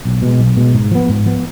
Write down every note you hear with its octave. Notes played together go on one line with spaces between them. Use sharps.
B1
B2 G#3
B1
B2 G#3
G#2
F3 B3
G#2
F3 B3